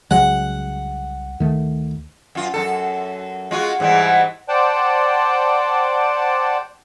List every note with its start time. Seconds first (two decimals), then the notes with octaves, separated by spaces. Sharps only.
0.11 C2 C#3 F#3 G#3 F#5
1.40 D2 D#3 A3
2.35 F#2 F4
2.54 F#2 C3 A4
3.51 G#3 F4 F#4
3.80 G#2 E3 G3
4.49 C5 D5 F#5 G5 A5